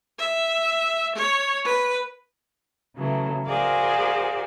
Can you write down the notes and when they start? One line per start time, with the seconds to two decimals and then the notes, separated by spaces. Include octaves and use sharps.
0.19 E5
1.16 C#5
1.65 B4
2.96 C#3 E3 F#3 A3
3.47 F#4 G#4 A#4 C5 D5 F5